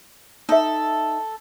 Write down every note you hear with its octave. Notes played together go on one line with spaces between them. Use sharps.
D#4 A4 E5